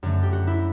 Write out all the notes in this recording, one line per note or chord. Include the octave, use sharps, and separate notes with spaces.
F#2 D3 A3
G4
F#4
E4